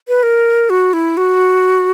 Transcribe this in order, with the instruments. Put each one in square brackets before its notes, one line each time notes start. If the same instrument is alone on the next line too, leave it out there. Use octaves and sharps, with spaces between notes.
[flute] B4
A#4
F#4
E4
F#4